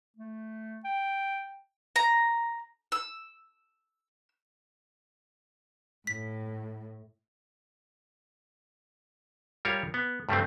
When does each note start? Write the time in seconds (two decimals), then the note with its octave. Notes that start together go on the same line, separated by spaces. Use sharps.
0.16 A3
0.85 G5
1.96 A#5
2.92 E6
6.07 A2 B6
9.65 G3 F4 A#4 C#5
9.94 B3
10.29 G2 G3 A3 C4